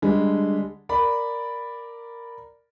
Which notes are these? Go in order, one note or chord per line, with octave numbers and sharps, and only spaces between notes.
D3 G3 G#3
A#4 D5 B5